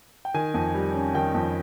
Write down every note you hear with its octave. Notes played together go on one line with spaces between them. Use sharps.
G5
D#3 G#5
F2
G3
C#4
D#3 G5
F2